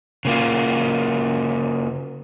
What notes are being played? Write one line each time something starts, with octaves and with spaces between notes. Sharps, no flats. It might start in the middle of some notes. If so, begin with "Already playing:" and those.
C#3 A#3 F4